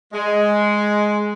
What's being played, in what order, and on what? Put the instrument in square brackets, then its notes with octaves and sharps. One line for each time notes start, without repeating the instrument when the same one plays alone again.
[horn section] G#3